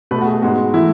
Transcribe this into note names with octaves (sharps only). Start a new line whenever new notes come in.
B2 A3 B4
F#4
G#4
G#2 G#3 B3 F#4
E3 A3 E4